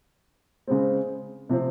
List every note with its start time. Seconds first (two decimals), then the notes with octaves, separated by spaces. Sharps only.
0.67 C#3 G#3 C4
1.49 C3 F3 C4